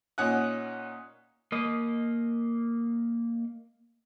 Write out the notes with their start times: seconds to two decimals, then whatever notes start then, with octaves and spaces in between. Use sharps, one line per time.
0.18 A#2 C#4 D#4 F#5 G#5 F#6
1.52 A#3 D#5